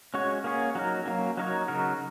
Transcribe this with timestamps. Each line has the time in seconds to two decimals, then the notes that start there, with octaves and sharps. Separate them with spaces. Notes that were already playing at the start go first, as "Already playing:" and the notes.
0.14 G#3 C#4 F#4 C#5
0.44 A#3 C#4 G#4 C#5
0.75 F#3 D#4 A#4
1.06 F#3 A#3 C#4
1.37 F#3 D#4 A#4 C#5
1.68 C#3 F#3 D#4 F#4 A#4